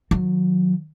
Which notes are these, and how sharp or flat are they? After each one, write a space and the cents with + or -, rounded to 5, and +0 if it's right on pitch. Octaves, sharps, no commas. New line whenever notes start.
D#3 +0 F#3 -25